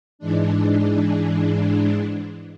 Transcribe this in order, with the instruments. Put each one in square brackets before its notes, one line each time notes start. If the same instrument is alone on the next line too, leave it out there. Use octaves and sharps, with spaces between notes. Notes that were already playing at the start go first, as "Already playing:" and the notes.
[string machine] G#2 E3 G#3 D4